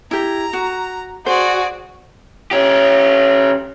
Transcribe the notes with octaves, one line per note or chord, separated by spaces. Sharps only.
E4 G4 A#5
F#4
F#4 G#4 C5 D5
C#4 G4